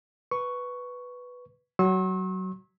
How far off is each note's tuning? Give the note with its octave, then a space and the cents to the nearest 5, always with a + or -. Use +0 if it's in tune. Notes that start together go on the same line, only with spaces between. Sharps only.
B4 +0 C#6 +5
F#3 +20 C#6 -45 E6 -30